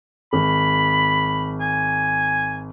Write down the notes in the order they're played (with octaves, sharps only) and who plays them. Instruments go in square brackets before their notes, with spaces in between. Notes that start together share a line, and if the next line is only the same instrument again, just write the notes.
[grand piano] G#1 [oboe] B5
[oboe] G#5